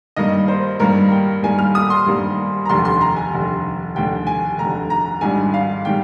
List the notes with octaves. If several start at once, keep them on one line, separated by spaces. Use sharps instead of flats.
G2 D#3 G3 A#3 D#5
C5
G2 D#3 G3 A#3 A#4
G5
G2 D#3 G3 A#3 G#5
F6
D#6
C6
G2 D#3 G3 A#3
A#5
F1 D#2 D3 C6
C6
A#5
G#5
F1 D#2 D3
F1 D#2 D3 G5
G#5
F1 D#2 D3 A#5
A#5
G#1 G#2 D#3 G3 D4 G#5
F5
D#3 G3 G5